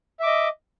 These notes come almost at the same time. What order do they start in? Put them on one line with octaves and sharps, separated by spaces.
E5 D6 D#5